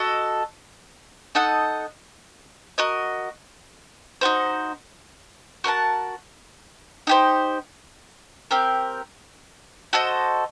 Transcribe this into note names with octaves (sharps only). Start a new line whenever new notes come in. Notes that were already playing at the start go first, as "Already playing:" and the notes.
Already playing: F#4 A4 D#5
D#4 A4 D#5 F#5
F#4 A#4 D#5
D#4 F#4 C5
F#4 A#4 F#5 A5
D#4 G4 C5
C4 G4 A#4
F#4 A4 C5 D#5